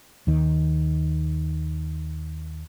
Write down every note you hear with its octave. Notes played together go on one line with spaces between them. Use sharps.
D#2 D#3